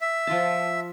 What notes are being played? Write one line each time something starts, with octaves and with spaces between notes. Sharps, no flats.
E5
F3 F4 A5